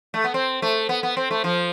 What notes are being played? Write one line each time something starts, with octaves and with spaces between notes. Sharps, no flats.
A3
B3
C4
A3
B3
B3
C4
A3
F3